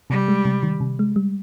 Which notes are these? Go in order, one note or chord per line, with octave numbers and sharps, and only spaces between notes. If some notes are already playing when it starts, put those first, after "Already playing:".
C3 G3
G#3
C3
D#3
C3
G#3
G3